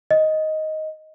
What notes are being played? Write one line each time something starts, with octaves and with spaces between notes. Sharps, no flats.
D#5